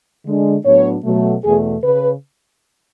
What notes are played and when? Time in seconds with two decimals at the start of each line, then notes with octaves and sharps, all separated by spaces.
0.24 D3 G#3 D4
0.64 A2 F#3 B3 D4 C#5
1.04 B2 F#3 A3
1.44 E2 B2 A3 G#4
1.83 C#3 B4